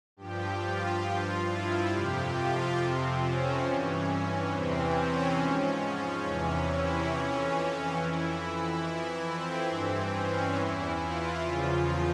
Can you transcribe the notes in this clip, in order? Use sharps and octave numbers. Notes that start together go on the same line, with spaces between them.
G2 F3 G4
F4
G2 F3 F4
E4
F2 C3 F3 G4
F4
F2 C3 F3 C4
C#4
G2 E3
E2 C3 E3 C4
C#4
G#2 F3
E2 C3 E3 C#4
E4
F2 E3 C#4
F2 E3 E4
E4
F2 E3
C4
G2 E3
C#4
E2 E3 E4
F4
E2 C#3 F3